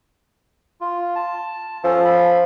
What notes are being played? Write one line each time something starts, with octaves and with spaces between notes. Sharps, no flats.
F4
A5
F3 C#4 A4
B5